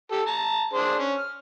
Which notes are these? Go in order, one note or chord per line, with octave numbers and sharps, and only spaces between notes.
G4 A4
A5 A#5
D4 G#4 C5
C#4
F6